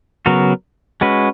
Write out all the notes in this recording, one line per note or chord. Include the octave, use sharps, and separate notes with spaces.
C#3 F#3 B3 F#4 A#4
G#3 C#4 F#4 B4